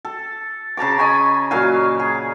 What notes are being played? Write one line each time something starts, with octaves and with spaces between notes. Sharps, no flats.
A4
C#3 A5 A#5 D6
D#5 G#5 B5 C#6
A#2 F#3 F5 G#5
G#4